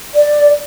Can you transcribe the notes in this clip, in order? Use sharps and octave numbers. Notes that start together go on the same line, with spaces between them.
D5